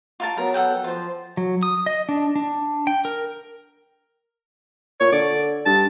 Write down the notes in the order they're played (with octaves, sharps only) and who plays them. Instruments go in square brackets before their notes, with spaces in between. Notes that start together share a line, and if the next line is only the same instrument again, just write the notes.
[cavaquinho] F4 A#4 A5
[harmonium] F#3 B3 [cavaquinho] A#4
[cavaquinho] A4 F#5 G5
[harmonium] F3 [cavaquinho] F4 C5
[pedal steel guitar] F#3
D#6
D#5
D4
D4
G5
A#4
[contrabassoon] A#2 [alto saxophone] C#5
[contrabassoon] D3 [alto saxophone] D5
[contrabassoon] G2 [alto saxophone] A5